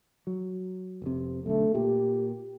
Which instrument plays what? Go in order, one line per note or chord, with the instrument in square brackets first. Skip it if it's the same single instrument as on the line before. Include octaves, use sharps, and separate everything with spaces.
[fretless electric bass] F#3
F1 C3
[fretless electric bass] B1 D3 [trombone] A3
[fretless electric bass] A#2 [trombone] G4